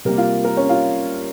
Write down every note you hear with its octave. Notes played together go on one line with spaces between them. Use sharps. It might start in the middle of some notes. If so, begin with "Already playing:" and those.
C3 G3 A#3 A#4
F4 F5
A#4
C#4 C#5
F4 F5